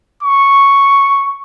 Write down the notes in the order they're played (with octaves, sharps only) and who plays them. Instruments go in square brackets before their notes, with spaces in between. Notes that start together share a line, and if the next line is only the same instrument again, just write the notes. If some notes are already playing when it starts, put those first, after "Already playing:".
[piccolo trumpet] C#6